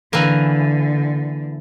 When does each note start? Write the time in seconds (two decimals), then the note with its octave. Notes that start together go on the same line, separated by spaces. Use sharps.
0.13 D3 E3 A#3